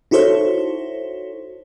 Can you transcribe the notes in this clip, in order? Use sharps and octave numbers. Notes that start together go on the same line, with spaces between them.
D#4 E4 F#4 A4 C5 C#5